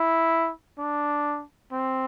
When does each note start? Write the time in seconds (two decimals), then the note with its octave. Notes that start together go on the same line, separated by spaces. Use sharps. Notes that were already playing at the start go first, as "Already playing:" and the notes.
Already playing: E4
0.78 D4
1.72 C4